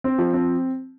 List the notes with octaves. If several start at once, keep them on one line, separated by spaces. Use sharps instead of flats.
C4
F3
C4